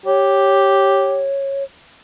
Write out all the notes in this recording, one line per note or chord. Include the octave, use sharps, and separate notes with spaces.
G4 C#5